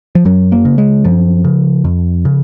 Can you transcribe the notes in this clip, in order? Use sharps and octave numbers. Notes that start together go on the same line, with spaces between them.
F3
F#2 F#3
A#3
C#3
G#3
F#2 F3
C#3
F2
C#3